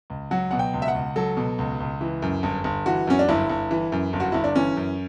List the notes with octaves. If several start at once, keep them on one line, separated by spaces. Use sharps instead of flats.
C#2
F#3 F#5
B2 F#5
G5
C#2
E5
F#5
C#2
F#3 A4
B2
C#2
C#2
E3
F#2
G1
G1
E3 F#4
F#2 C#4
D4
G1 E4
G1
E3
F#2
G1
F#4
G1 E4
D4
E3 C#4
F#2